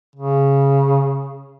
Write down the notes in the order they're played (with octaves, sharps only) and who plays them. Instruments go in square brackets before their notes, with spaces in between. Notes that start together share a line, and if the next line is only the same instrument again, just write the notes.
[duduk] C#3